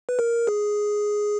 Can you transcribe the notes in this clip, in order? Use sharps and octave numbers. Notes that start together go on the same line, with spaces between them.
B4
A#4
G#4